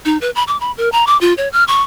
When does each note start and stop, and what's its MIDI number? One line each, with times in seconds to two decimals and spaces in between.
0.05 0.18 63
0.21 0.30 71
0.35 0.43 83
0.48 0.59 86
0.60 0.72 83
0.78 0.91 70
0.92 1.05 82
1.07 1.19 86
1.21 1.34 65
1.37 1.49 73
1.53 1.64 89
1.68 1.82 85